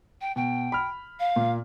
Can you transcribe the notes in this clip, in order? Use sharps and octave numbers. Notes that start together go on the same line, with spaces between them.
G5
B2 G5
B5 F6
F5
A#2